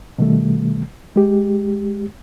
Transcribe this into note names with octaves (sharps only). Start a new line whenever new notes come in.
B2 D#3 G3 A3
G#3 G4